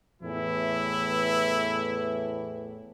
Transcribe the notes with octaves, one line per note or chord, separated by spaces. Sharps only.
E2 A2 E3 E4